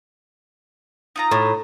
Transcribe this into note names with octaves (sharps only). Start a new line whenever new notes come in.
D#4 F4 A#5
A2